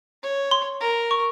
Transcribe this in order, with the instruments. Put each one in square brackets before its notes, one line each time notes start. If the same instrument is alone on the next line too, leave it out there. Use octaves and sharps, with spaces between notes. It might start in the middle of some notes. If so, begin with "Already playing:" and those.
[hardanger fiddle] C#5
[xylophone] C6
[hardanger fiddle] A#4
[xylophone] C#6